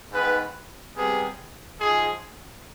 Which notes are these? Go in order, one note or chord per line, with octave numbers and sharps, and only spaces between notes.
G#2 D#3 B3 B4
C3 G3 B3 G#4
G#2 F3 G#3 G#4